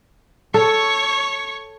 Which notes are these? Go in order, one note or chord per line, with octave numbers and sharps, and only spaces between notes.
A4 C#5 C#6